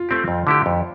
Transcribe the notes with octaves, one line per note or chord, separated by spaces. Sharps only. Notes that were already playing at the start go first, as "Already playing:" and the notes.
Already playing: F4
A3 C4 G4
F2
D3 A3 E4 G4
F2